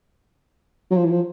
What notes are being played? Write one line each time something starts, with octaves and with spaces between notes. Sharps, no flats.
F#3
F3
E3
F3